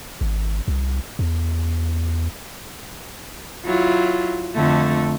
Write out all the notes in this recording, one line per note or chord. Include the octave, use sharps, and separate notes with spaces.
G#1
C2
E2
F#3 E4 F4
F2 D3 A3